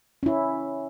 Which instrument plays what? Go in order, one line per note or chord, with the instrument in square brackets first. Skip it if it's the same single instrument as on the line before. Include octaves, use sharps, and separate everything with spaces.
[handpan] C#4 E4